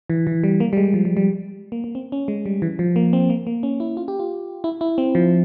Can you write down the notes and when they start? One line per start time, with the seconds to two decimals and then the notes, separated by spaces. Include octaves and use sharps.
0.10 E3
0.27 E3
0.43 G3
0.60 A#3
0.73 G3
0.77 G#3
0.94 F3
1.05 G3
1.17 G3
1.72 A#3
1.84 A#3
1.95 C4
2.12 C#4
2.28 G#3
2.46 G3
2.62 E3
2.79 F3
2.96 A#3
3.13 C4
3.30 A#3
3.47 A#3
3.63 C#4
3.80 E4
3.97 F4
4.08 G4
4.19 F4
4.64 E4
4.81 E4
4.98 C4
5.15 F3